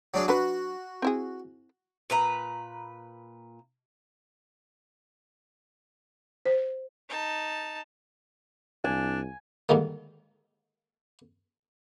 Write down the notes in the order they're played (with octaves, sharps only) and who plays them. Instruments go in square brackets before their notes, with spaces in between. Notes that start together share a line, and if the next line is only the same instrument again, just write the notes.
[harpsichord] F#3 D4 G#4
[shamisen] F#3 D4 B4 [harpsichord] F#4
[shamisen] C4 E4 G#4
[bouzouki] A#2 B4 A#5
[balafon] C5
[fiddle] D#4 A5
[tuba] C2 [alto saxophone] D4 [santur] G#5
[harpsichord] G#2 D3 D#3 G3 A#3